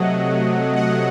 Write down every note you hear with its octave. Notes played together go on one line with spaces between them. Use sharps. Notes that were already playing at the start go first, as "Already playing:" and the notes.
Already playing: C3 F#3 A3 D#5 F#5
D#5 F#5